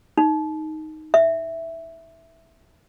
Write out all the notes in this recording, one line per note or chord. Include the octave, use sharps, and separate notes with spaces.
D#4
E5